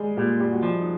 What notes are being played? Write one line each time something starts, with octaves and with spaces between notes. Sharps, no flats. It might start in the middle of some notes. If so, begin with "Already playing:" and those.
Already playing: G3 G#3 G#4
A#2 G3 G4
G3 G4
F#4
F3 G3 G4
D#4